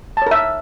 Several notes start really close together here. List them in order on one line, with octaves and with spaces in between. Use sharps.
A5 C#5 A#4 E5